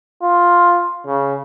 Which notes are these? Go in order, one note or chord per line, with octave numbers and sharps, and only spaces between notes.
F4
C#3